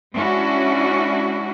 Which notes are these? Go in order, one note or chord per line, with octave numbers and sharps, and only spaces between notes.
G#3 C#4 D4 E4 F#4